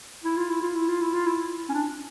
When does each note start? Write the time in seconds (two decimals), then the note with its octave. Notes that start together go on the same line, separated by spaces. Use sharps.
0.24 E4
0.37 F4
0.50 E4
0.62 F4
0.75 E4
0.88 F4
1.01 E4
1.14 F4
1.27 E4
1.69 C#4
1.74 D4